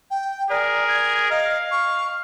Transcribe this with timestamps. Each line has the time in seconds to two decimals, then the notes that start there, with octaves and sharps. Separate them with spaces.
0.11 G5
0.50 G#4 A#4 D5
0.88 G#6
1.30 D#5 F5
1.71 C#6